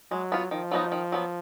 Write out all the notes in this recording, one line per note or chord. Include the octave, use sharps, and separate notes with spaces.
F#3 G#3
B3 F4
D#3 F3
F#3 B3 D#4 F#4
D#3
F#3 B3